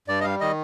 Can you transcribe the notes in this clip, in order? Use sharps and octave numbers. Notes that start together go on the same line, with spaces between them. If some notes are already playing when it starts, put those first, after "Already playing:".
G2 D5
D#5
G3 F5
D#3 D#5